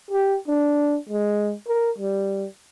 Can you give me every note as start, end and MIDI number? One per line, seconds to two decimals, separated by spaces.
0.11 0.37 67
0.48 0.97 62
1.09 1.53 56
1.67 1.91 70
1.98 2.47 55